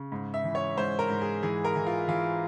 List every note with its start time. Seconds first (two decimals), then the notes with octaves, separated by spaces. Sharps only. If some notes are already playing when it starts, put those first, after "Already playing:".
Already playing: C#3
0.12 G#2
0.34 E5
0.44 E3
0.55 C#5
0.77 G#2 C5
0.99 A#4
1.10 G#2
1.21 G#4
1.43 E3 G#4
1.64 A#4
1.75 E3
1.87 F4
2.08 E3 F4